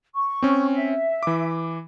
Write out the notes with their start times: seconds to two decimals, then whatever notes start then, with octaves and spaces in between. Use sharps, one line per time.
0.15 C#6
0.42 C4 C#4
0.75 E5
1.23 E3 D6